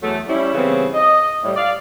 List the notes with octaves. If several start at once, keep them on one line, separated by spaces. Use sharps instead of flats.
E2 F#3 A3
G3 C#4 E4
C#3 E3 G3 B3 C4
D#5
A2 G3
D5 F5